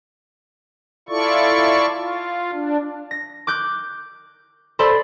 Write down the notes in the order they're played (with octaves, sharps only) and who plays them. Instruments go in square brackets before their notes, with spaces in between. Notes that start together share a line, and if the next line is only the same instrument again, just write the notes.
[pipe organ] E4 F4 A4 D5 C#6
F4
D4
[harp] A#6
D6 F#6 G6
A4 C5 D5 B5 C6